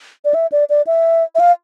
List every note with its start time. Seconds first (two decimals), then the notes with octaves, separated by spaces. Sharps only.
0.25 D5
0.34 E5
0.52 D5
0.70 D5
0.87 E5
1.35 E5
1.40 F5